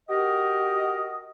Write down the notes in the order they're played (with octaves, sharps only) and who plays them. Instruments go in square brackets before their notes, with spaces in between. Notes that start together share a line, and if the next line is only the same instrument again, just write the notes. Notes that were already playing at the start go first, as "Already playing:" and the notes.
[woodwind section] F#4 G4 A#4 D#5